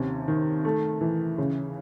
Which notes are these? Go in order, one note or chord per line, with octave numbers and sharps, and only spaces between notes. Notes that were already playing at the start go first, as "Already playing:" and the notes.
Already playing: D#2 C3 C#4
D#3
A3
E3
C#3